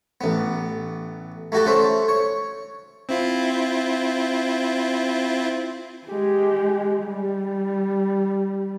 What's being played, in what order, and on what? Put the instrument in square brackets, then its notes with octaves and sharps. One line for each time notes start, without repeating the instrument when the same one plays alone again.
[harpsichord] A1 B3
A3 E4 F#4 G4 A4
A3 C#4 C5 E5
C#5
[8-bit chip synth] C4 E4 F4
[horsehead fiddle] G#3 G4
G3